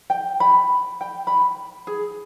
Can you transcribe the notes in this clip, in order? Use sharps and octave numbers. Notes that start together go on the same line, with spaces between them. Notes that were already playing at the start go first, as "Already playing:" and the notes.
G5
B5
G5
B5
G#4